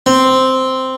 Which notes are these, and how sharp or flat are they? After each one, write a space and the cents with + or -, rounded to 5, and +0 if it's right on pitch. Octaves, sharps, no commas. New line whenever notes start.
C4 -5